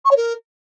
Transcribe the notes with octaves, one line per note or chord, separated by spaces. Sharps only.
C#6
C#5
A#4